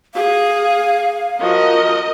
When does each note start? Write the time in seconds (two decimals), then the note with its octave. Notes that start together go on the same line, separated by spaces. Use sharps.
0.14 G#4 F5
1.40 F3 F#4 A#4 D#5